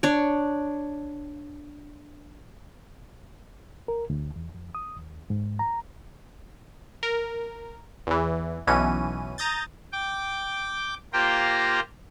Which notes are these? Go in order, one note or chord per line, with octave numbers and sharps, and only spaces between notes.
D4 C#5
A#4
D2
E2
F2
D#6
D#2
G#2
A#5
A#4
E2 E3
B1 B2 E3 C#4 D#7
A#5 D#6 G6 A6
G5 D6
A#3 F4 G4 C5 G5 A#5